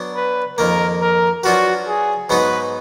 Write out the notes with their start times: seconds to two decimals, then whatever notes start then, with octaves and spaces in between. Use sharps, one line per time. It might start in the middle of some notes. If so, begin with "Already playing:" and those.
Already playing: F#3 B3 D4
0.15 B4
0.58 F2 D#3 A#3 A#4
1.01 A#4
1.44 F#3 D4 F4 F#4 B4
1.87 G#4
2.30 G#2 F#3 B3 D#4 F#4 B4